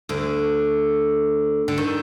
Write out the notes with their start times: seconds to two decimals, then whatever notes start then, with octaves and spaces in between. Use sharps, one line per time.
0.09 D2 D3
1.68 D3
1.78 D#3